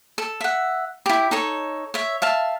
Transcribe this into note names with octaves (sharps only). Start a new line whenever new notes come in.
A4
E5 F#5
E4 G4
D#4 A4 C#5
C#5 E5
E5 F5 A5